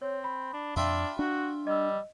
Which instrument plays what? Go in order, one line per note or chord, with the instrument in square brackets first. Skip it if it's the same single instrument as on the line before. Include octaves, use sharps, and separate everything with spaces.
[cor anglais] C4 [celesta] C#5
[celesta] B5
[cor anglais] D4
[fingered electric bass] F2 [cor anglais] D4 [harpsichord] F4 E5 G5
[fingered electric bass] D4 [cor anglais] F#4
[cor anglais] G3 [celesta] D#5 E6